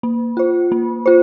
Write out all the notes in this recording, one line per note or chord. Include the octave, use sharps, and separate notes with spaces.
A#3
F4 C5
A#3
F4 C5